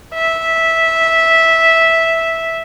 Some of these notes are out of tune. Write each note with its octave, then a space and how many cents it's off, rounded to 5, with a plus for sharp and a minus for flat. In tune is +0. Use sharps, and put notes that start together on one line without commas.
E5 -10